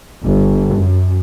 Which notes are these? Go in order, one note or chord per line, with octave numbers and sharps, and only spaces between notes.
G1
F#2